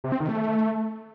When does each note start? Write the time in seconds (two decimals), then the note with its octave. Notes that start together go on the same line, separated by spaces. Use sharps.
0.04 C3
0.12 C4
0.20 D#3
0.29 A3